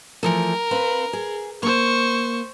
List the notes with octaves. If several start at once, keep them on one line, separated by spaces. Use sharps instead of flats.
E3 F3 A3 A#4
C4 B4 F5
G#4
A#3 C5 C#6